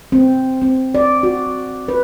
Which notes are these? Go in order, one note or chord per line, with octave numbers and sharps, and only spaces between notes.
C4
C4
D5
F#4
B4